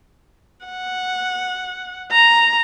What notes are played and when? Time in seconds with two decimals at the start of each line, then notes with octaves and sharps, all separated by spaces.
0.65 F#5
2.12 A#5